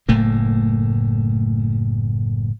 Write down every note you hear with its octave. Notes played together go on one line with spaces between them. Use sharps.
F#1 A2 A3 A#3